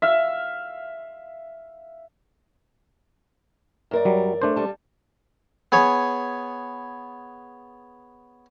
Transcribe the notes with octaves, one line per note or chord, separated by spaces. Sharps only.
E5 F5
F#2 A#4 D5
F#3 G3
A3 D4 C5
G3 A5
B3 G#4 C#5